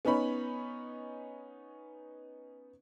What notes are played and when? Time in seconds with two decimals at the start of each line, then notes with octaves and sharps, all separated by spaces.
0.05 B3 C#4 D#4 C#5 B5